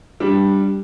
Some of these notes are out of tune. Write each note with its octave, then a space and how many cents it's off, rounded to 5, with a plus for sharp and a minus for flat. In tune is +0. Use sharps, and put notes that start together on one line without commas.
G3 +0 D4 +0